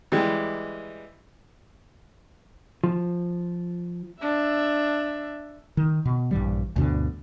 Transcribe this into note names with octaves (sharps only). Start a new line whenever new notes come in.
E3 G3 G#3 G4
F3
D4 E5
D#3
B2
A#1 G2 E3 G3
D2 G2 B2 D3